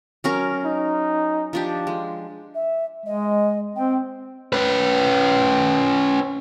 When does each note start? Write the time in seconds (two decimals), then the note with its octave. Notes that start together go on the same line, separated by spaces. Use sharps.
0.24 F#3 C#4 A#4
0.65 D#4
1.53 F3 D4 G4
1.87 G#3 F4
2.54 E5
3.06 G#3 D#5
3.76 C4 G5
4.53 C#4 B4